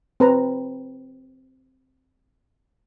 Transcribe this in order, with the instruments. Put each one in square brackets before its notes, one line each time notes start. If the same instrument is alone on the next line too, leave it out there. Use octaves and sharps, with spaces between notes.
[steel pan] C4 B4 A#5